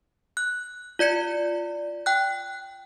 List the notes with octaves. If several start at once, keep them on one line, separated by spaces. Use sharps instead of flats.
F#6
F4 D5 G#6 C#7
G5 F#6